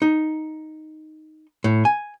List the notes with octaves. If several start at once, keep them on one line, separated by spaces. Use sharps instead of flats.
D#4
A2
G#5